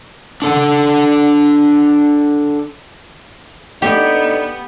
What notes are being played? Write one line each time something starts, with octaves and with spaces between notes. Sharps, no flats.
D4 A4 F#5
D3 B3 D#4 G4